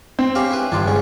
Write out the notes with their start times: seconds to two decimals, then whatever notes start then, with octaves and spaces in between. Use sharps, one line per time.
0.19 C4
0.35 C#4 G4 F5
0.51 E4 B4
0.72 G1 D4 F4
0.86 G#2 C#4